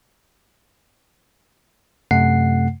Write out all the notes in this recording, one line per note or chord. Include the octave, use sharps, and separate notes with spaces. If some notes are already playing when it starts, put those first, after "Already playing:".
F#2 C3 A3 F#5 C7